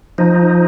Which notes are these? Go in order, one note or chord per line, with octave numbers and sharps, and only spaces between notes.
F3 D#4